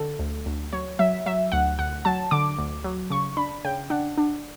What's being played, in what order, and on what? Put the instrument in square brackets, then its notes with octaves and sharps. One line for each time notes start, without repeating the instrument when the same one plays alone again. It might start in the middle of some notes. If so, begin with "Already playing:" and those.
Already playing: [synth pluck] D3 A4
D2
D2
F#3 C#5
F#3 E5
F#3 E5
D2 F#5
D2 F#5
F#3 A5
D3 D6
D2
F#3
C#3 C#6
D4 B5
C#3 G5
D4 F#5
D4